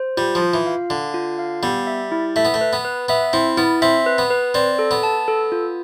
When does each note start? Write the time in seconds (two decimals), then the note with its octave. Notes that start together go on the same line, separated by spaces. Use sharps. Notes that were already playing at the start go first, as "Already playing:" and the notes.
Already playing: C5
0.17 G3 F4
0.35 F3
0.42 F4
0.54 E3
0.66 F5
0.90 D3 F5
1.14 F4
1.39 F5
1.63 G3 B3
1.87 E5
2.12 E4
2.36 A3 E5
2.45 B3
2.54 A3
2.61 B4
2.73 B3
2.85 B4
3.08 B3 E5
3.33 C4 E4
3.57 B3 E4
3.82 C4 E5
4.06 B4
4.18 B3
4.30 B4
4.54 C4 D5
4.79 A4
4.91 B3
5.03 A5
5.28 A4
5.52 F4